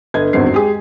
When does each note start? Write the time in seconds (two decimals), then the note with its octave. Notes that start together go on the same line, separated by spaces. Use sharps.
0.14 G1 B4 D#5 G#6
0.33 G#1 E2 G2 F#3 C4 C7
0.52 G#3 G4 G#4